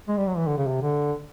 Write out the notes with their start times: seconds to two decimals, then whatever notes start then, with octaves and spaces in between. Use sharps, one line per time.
0.08 G#3
0.17 G3
0.27 F#3
0.37 E3
0.47 D3
0.57 C#3
0.67 C3
0.81 D3